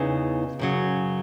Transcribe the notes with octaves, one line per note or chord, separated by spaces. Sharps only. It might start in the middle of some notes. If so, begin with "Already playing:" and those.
Already playing: E2 C#3 E3 B3 D#4
F#2 C#3 F#3